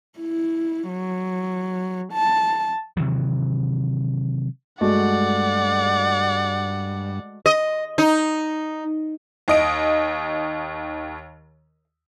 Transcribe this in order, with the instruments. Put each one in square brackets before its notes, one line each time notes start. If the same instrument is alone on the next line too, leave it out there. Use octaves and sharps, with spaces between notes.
[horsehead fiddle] E4
F#3
A5
[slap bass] C3 D#3 E3 F#3
[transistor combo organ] G2 [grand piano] G#3 A3 F#4 [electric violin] D5 F#5
[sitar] D#5
D#4
[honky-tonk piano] D#2 D#5 D7